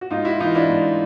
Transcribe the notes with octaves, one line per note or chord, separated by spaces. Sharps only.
F#4
G#2 D#4 F4
E4 F#4
E3 D#4 F4
D4 E4
G#2